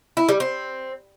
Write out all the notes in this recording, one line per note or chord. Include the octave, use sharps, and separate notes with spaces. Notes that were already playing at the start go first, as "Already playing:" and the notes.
E4
G3
C4